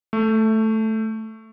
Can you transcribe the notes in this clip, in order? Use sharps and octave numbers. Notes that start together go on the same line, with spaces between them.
A3